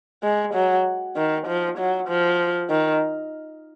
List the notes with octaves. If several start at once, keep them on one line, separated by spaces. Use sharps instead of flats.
G#3
F#3
D#3
F3
F#3
F3
D#3